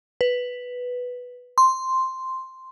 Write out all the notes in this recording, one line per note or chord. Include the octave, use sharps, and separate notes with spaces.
B4
C6